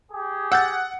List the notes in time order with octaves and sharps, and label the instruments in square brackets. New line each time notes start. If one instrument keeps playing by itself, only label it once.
[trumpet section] G4 G#4
[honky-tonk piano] F#5 [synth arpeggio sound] E6 G6 A6